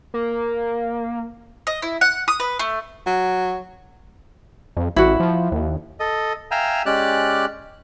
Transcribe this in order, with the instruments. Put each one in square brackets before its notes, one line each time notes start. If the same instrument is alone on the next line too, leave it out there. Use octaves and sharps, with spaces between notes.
[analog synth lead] A#3
[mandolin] D#5
E4
F#5
D#6
B4
A3
[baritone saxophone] F#3
[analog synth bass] F2
[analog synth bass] A1 [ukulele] E4 F#4
[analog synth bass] F3
D#2
[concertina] A4 D#5
E5 F5 G5 G#5 A#5 E6
G#3 C#4 G4 D5 F#6